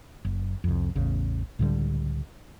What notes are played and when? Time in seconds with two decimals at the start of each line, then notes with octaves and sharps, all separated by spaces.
0.25 F#1
0.64 C2 F2
0.95 A1 E2 C#3
1.59 C#2 A2 D3 G3